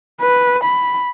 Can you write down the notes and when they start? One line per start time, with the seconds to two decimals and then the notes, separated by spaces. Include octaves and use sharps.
0.22 B4
0.64 B5